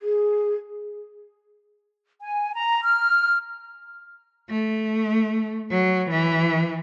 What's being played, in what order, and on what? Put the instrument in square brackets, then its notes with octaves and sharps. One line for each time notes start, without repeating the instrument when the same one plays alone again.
[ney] G#4
[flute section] G#5
A#5
F6
[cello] A3
F#3
E3